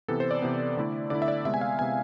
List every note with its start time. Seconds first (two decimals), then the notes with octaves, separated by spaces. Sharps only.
0.08 C3 E3 B3 A4
0.20 C5
0.31 D5
0.42 C3 E3 B3
0.77 D3 A3 E4
1.10 D3 A3 E4 D5
1.22 E5
1.28 D5
1.45 C3 G#3 B3 E5
1.54 G#5
1.61 F5
1.79 C3 G#3 B3 G#5